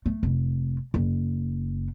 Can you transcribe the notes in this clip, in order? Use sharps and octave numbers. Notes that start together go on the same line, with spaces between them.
A3
F1
F#1